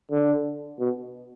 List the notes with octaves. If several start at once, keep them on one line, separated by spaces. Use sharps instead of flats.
D3
B2